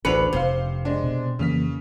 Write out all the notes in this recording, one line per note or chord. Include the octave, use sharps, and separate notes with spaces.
A1 D2 D4 B4 C#7 F7
F1 C3 C5 F5
G#3 D4
B2
F2 C#3 E3 A#3 F6 B6